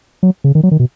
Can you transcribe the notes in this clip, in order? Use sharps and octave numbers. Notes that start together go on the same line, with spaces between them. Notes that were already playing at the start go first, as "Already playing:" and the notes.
F#3
C#3
D#3
F#3
D#3
B2